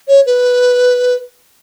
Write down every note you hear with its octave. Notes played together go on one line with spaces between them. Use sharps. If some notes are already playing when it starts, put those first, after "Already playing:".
C#5
B4